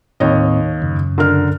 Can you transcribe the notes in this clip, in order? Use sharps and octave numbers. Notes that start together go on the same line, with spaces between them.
D#2 A2 C4 C#5 D#5
F#2 C#3
D3 A#4 F6